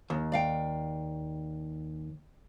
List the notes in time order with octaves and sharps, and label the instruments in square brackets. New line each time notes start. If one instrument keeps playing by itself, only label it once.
[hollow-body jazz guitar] D#2
[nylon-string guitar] D5 F5 G5